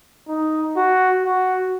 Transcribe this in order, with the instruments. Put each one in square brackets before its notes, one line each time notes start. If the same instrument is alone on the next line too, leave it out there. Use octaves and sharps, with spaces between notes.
[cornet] D#4
F#4
F#4